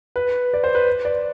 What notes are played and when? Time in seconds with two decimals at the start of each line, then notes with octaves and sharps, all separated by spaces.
0.16 B4
0.54 D5
0.64 C5
0.75 B4
1.05 D5